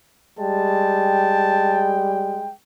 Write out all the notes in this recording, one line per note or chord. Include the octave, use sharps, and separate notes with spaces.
G3 G#3 G5 A5